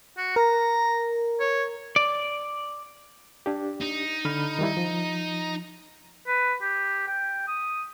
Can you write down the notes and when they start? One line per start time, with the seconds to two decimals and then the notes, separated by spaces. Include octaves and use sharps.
0.17 F#4
0.36 A#4 A#5
1.40 C#5
1.96 D5
3.46 D4 G4
3.81 D#4
4.25 D3 B5 F6
4.59 D#3 G3 E4
4.77 F3
6.27 B4
6.61 G4
7.07 G5
7.48 D#6